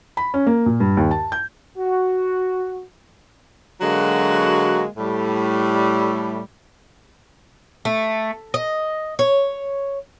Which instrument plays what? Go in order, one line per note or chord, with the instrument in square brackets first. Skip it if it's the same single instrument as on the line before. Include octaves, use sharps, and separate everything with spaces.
[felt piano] B5
C#4
A#3
A#2
G2
D#2
A5
G6
[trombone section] F#4
[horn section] D3 F#3 G#3 A#3 F#4
A2 G3 A3
[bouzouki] A3
D#5
C#5